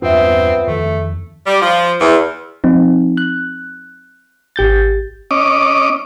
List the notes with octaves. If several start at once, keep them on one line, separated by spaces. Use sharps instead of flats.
E2 G2 B3 C4 D4 F4 E5
F2 D#3 E3 A3
G3
F3
E2
F3 C4 D#4
F#6
G#1 G4 G6 A6
C#4 D#5 D6